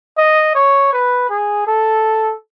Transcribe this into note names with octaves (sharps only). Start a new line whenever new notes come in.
D#5
C#5
B4
G#4
A4